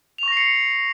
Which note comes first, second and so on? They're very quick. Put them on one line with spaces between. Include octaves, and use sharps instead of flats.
F7 C#6 A#6 C7 C#7